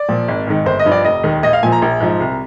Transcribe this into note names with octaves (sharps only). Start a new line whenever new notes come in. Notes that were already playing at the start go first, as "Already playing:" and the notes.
Already playing: D5
A#2 F3
G#1
G#2 D#3
G1 C5
D#5
G2 F3
D5
F1 D#5
D#2 D#3
A#1 D#5
F5
A#2 F3 G#5
A#5
A#1
G#2 F3
C2